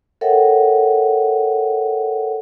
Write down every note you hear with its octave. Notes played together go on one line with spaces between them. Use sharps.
A4 A#4 C#5 E5 F#5 G5